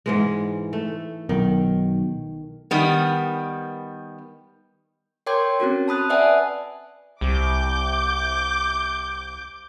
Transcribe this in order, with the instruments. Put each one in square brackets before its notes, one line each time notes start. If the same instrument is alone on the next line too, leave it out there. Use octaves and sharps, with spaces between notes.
[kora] G#2 E3 G#3
A3
[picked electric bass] B1 [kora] D#3
[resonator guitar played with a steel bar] D#3 G3 B3
[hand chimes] A#4 C#5 G5 C6 D6 G#6
C4 C#4 F#4 A4
A5 B5 D#6 F#6
B4 D5 E5 F#5 G#5 A5
[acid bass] C2 [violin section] D6 G6